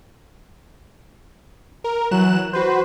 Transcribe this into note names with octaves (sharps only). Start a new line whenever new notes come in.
A#4
E3 F#3 F#6 E7
F#4 B4 C5